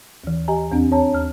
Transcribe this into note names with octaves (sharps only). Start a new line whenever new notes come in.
D#2 E3
G4 D#5 G#5 A#5
E2 C4 D4
C#5 A5 A#5
D#2 F6